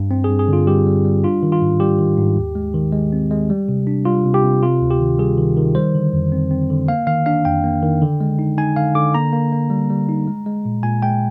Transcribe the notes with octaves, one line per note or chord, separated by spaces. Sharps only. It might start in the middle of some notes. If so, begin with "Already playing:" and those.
Already playing: G2
C4
G#4
G2
G#4
D3 F4
G3 G4
G3
G3
D4 F4
D#3
F4
G#2
G3 G4
D#3
G#2
D#2
G#3
D#3
G#3
C4
G#3
G3
C3
D4
G3 F4
C3
G4
C3
C3 F4
D2
G4
D#3
G3 G#4
D#3
D#3
G3 C5
D3
F2
C4
C4
D3
A#3 F5
D#3 F5
D4 F5
F2 G5
A#3
D#3
D3
G#3
D#4
D#4 G#5
D3 F5
D3 D6
A#3 A#5
A#3
A#3
G3
G3
D#4
G#3
G#3
A#2
A#2 G#5
G#3 G5